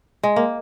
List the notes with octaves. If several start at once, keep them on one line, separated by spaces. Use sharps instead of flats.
G#3
A#3